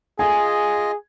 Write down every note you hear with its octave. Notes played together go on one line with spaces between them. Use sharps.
F4 G#4 D#5 G#5